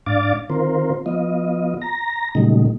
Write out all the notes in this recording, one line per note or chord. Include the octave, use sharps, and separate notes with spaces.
G#2 D4 D5 F5 D6 A6
D#3 C4 F4 A#4 C5
F3 B3 F4 D#5
A#5 A#6
A#2 C#3 F#3 G3 A3 D#4